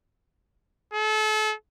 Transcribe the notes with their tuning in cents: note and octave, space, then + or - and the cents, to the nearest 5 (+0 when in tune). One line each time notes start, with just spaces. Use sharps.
A4 -35